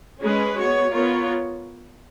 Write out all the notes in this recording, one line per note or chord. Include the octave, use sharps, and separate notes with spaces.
G#3 C#4 G#4 B4
B3 F#4 C#5
B3 F4 A#4 C#5